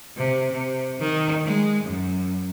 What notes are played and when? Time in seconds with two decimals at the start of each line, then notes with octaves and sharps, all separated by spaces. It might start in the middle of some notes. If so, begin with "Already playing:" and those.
0.16 C3
0.52 C3
0.99 D#3
1.45 G#3
1.84 F#2